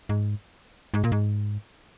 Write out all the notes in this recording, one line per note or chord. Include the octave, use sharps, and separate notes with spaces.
G#2
G#2
A#2
G#2